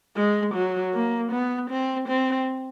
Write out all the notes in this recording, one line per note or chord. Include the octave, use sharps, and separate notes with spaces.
G#3
F#3
A#3
B3
C4
C4